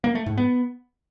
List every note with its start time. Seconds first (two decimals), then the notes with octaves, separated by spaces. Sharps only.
0.04 A#3
0.15 A3
0.26 G#2
0.38 B3